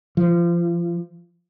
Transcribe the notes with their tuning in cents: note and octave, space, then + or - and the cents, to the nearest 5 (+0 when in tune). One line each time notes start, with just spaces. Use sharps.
F3 -30